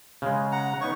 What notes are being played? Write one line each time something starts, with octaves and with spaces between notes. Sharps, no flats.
C#3 G#3
F#5 A#5
B3 D#4 C#5 C#6